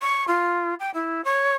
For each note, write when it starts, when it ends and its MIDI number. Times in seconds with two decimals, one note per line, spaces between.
0.02 0.24 85
0.28 0.74 65
0.80 0.90 79
0.94 1.21 64
1.25 1.56 73